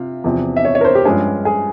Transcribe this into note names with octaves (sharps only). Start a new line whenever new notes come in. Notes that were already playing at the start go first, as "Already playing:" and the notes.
Already playing: C3 F4
E2 C3 F3
E5
C#5
C#5
A#4
C5
G4
G2 F3 G#3 C#4 G#4
G#4